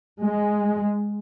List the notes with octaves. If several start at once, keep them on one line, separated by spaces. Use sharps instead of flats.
G#3